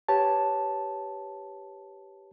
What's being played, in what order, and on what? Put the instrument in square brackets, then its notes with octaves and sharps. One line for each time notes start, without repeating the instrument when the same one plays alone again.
[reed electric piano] G4 B4 C#5 A5